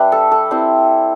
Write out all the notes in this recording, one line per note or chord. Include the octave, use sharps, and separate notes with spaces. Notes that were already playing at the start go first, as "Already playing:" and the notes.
Already playing: G3 D4 B4 E5
A4
A4
G3 C4 E4 C5